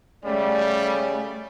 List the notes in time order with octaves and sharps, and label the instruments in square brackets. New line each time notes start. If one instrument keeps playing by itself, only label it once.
[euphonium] C#3 [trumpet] G3 [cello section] A3 [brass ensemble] D5